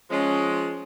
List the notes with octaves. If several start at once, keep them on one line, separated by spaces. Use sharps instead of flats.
F3 G#3 C#4